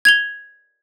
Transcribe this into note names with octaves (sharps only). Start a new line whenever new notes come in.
G#6 F7 G7